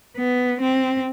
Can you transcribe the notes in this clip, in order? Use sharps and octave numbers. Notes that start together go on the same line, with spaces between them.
B3
C4